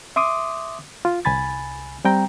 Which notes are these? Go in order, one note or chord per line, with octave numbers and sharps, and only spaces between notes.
E5 C6 D6 D#6
F4
C2 G#5 B5 A6
G3 C4 G5 A#5